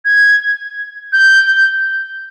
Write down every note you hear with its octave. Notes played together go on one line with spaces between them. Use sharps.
G#6
G6